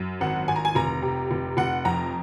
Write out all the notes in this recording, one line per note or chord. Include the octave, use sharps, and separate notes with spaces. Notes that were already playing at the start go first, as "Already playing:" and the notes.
Already playing: F#2
G#1 F#5
G#1 G#5
A#5
G#5
F1 A#5
C3
F1
F1 F#5
F2 A#5